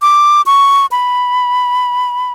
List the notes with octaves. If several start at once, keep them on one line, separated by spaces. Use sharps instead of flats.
D6
C#6
B5